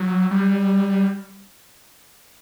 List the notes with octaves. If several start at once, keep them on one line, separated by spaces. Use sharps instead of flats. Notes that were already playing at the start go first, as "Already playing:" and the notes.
Already playing: F#3
G3